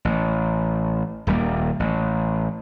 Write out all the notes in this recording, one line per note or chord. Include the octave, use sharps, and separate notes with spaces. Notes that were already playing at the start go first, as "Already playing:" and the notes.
A1
D#1 D#2 G3 A#3
A1